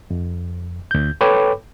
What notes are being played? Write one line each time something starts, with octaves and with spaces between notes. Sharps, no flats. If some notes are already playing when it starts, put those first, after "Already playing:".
F2
D2 G6
A4 B4 C#5 G5 B5 D6